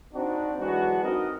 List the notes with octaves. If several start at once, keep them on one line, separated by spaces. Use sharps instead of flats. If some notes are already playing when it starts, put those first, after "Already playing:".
C4 D4 D#4 F#4
E3 F#3 G#3 B3 D4 F#4
C4 D#4 F#4 A#4 D#5